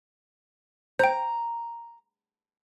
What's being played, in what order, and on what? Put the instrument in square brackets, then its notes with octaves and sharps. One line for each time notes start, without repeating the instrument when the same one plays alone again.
[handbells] C5 G5 [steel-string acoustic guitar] A#5